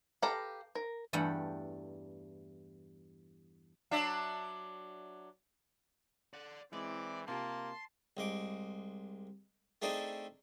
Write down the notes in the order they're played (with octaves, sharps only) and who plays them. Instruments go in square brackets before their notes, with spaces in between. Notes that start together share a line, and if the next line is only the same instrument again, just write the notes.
[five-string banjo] G4 A4 B4 F5 A#5
A#4
[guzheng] E2 G2 G3 A3 G4 F#5
[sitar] F#3 D4 E5
[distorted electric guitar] D5 F#5
[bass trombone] E3 [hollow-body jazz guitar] G#3 E4 [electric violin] C4 [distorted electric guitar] D5
[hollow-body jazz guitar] C3 F4 G4 [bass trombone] A#3 [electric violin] A5 [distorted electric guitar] C6
[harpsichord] C2 G#3 D6
A3 C4 D4 D#4 G#4 A4